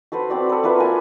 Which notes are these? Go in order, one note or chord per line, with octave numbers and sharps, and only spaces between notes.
F#4 A4 B4 C5
C4 F#4 D5
A4 B4
A#3 F4 B4 E5
A#4 G#5